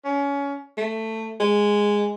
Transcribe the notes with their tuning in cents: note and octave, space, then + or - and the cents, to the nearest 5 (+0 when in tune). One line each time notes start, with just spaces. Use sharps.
C#4 +25
A3 +15
G#3 -10